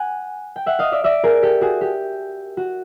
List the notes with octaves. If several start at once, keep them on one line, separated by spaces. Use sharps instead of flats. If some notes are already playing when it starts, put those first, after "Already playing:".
Already playing: F#5 G#5
G5
E5 F#5
D#5 F5
D5 E5
D5 E5
G#4 A#4
G4 A4
F#4 G#4
G4
F#4